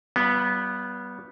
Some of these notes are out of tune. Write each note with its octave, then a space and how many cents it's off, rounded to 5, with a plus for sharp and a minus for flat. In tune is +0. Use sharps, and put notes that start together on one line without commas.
G3 -30 B3 -10 F4 -30